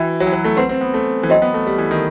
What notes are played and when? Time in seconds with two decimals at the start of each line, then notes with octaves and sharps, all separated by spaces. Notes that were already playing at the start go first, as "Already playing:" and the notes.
Already playing: E3 F#4 B4 E5 G5
0.20 F#3
0.27 E3
0.33 F#3
0.45 A3
0.57 C4 B4 F#5 C6
0.69 C4
0.81 B3
0.94 A3
1.23 E3
1.30 F#3 C5 D#5 G5 C6
1.42 B3
1.54 A3
1.66 G3
1.78 E3
1.91 D#3